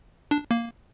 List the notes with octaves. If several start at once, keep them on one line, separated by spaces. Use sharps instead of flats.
D4
A#3